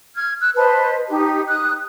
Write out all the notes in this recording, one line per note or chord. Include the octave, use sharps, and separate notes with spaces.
F6 G#6
E6 F#6
B4 C5 D#5 A5
D#4 G4
D#6 F#6